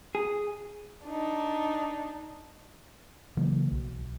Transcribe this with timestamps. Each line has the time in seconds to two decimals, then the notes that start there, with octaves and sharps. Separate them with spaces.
0.15 G#4
1.05 D4 D#4
3.37 C#3 E3 F#3 A#3
3.71 B1